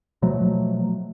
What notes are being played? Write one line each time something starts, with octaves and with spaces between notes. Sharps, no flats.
B2 F3 F#3 A3